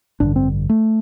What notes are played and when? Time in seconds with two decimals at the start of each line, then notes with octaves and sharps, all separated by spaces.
0.20 A1 G2 D3 D4
0.36 C4
0.69 A3